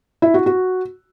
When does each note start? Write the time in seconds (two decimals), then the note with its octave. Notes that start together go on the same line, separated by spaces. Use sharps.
0.22 E4
0.34 F#4
0.46 F#4